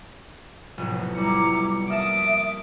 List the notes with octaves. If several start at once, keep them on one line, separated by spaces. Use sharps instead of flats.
F1 B1 A2
G3 E4 A#5 D6 C#7
A#3 E5 A5 D6 D#6 E7